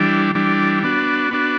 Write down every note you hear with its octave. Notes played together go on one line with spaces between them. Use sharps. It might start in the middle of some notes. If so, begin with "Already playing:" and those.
Already playing: E3 G3 D4
E3 G3 D4
B3 D4 F#4
B3 D4 F#4